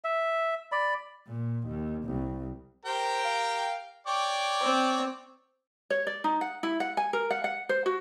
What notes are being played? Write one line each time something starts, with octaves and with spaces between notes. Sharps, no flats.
E5
D5 B5
A#2
D#2
C2
G4 A#4 C5 G5
F5
C#5 D5 G5 D6
C4
C#5
D5
D#4
F#5
E4
F#5
G#5
A#4
F#5
F#5
C5
F#4